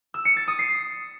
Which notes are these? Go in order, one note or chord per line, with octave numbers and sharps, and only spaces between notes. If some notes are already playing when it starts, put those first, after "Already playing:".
E6
C#7
A6
D#6
C7